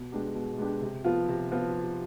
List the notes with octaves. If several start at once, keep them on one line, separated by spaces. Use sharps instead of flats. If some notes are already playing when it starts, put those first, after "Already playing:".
Already playing: B2
G#3 B3 D4 G4
B2
G#3 B3 D4 G4
C3
F3 B3 F4
C3
F3 B3 F4